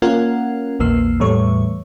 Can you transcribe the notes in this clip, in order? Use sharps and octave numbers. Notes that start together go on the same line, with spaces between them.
A#3 C#4 F4 A#4 F#5
A#1 E2 A#3 E6 C7
E2 A2 G3 A3 C#5 C#6